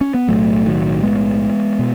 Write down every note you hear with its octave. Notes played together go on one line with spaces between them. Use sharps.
C#4
B3
B1 A2 F#3 A3
D#3 F#3
G#3 B3
B2